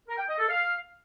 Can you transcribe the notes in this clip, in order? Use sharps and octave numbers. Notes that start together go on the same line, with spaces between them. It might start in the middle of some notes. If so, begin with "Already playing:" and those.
A#4
G5
D#5
A4
F5